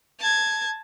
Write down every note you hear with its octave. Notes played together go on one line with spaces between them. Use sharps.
A5 G#6